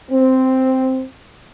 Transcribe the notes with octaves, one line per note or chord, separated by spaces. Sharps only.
C4